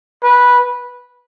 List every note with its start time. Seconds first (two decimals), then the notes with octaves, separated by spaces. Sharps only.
0.23 B4